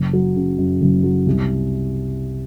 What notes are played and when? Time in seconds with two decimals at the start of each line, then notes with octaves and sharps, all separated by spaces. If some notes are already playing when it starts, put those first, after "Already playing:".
Already playing: F#1
0.13 F#3
0.36 C#3
0.58 F#2
0.81 F#1
1.04 F#3
1.26 C2